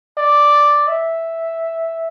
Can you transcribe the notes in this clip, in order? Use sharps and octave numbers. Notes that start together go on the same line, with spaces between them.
D5
E5